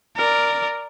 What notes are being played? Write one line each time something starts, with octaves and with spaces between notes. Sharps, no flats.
A#4 D5